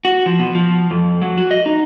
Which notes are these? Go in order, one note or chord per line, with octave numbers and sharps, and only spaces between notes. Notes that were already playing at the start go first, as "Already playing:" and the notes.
F#4
F3
B2
F3
F2
F#3
F#4
D#5
D#4